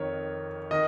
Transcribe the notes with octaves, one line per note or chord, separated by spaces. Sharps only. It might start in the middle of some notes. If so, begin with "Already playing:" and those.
Already playing: F2 D#3 C#5
D#3 D#5